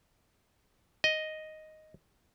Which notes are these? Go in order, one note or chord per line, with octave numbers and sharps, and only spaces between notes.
D#5